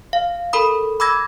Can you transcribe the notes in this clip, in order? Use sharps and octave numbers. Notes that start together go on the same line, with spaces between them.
F5
A4 A#4 B5 D#6
B5 D6 E6 G#6 A#6